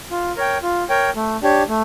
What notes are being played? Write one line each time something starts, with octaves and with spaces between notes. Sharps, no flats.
F4
A#4 C#5 G5
F4
A#4 C#5 G5
A3
D4 G4 C#5
A3